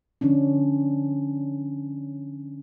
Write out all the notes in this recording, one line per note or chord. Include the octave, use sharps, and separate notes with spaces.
D3 F3 C#4 D4